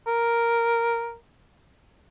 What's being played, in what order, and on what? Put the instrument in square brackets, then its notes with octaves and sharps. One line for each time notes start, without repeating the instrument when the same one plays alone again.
[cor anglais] A#4